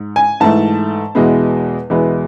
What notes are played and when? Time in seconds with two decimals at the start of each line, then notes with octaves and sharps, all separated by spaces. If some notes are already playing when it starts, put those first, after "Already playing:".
Already playing: G#2
0.16 G#5
0.40 G#2 E3 A3 A5
1.15 E2 B2 G#3 B3 E4
1.90 E2 B2 G#3 B3 E4